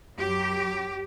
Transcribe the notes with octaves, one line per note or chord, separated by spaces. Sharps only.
F#2 F#3 G4